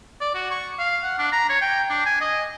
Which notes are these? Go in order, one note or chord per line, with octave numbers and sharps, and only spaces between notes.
D5
F#4
C#6
F5
F#5
D4
A#5
C#5
G5
D4
G#5
D#5